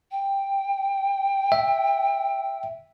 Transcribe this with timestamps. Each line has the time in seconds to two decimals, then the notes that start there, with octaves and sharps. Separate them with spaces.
0.11 G5
1.52 E5